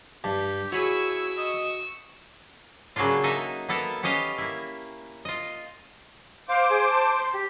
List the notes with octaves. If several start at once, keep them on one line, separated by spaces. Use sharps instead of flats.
G2 G4 A5
E4 F#4 G#4 B4 C#5 C#6 E6
D#5
C#3 F#3 A#3 D4 F4
A#3 D#4 A4 D#5 E5
A#3 B3 A4 A#4
B3 C#4 G4 D#5 F5
A#3 E4
F4 D#5
C5 F5 D6
G#4
A5
C6
G4